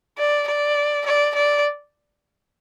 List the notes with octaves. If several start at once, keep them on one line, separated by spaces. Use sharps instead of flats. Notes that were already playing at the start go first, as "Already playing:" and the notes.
D5
D5
D5
D5